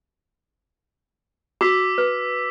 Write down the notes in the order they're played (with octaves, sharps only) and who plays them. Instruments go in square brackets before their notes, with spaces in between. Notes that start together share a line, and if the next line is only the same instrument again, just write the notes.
[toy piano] F#4 [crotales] D6 E6 B6
[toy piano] B4